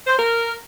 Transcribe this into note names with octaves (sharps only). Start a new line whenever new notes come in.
C5
A#4